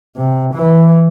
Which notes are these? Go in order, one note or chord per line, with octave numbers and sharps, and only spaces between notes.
C3
E3